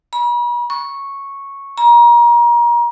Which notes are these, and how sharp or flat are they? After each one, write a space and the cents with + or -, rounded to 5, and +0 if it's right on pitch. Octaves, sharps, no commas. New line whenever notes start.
B5 -45
C#6 -5
A#5 +30